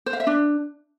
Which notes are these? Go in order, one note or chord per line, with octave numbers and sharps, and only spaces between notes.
C5
F5
E5
D4